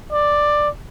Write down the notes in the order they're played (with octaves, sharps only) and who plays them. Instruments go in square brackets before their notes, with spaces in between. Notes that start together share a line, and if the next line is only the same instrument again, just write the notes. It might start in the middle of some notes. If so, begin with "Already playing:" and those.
[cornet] D5